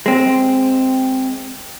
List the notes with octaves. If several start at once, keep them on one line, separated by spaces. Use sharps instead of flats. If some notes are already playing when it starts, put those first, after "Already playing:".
G#3 C4